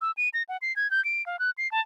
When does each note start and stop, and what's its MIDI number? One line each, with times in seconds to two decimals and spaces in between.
0.01 0.11 88
0.17 0.29 99
0.34 0.43 94
0.49 0.57 78
0.62 0.75 96
0.76 0.90 92
0.91 1.03 91
1.05 1.25 98
1.26 1.39 77
1.39 1.51 90
1.58 1.70 96
1.72 1.81 81